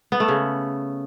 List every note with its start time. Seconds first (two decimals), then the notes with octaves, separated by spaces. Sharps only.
0.12 B3
0.20 A3
0.28 C#3